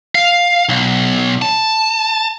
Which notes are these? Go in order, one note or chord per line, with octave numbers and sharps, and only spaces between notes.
F5
B1
A5